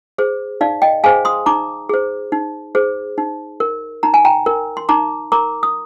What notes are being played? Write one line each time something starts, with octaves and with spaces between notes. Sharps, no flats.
G#4 C5
D#4 D5 F5
D#5 G5
G#4 C5 F5 G#5
C6 D#6
D#4 A#5 D6
G#4 C5
D#4
G#4 C5
D#4
A#4
D#4 A#5
G#5
G5 A#5
A#4
C6
D#4 A#5 D6
A#4 A#5 D6
D#6